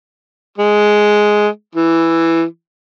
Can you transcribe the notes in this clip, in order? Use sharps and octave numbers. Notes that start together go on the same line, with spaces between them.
G#3
E3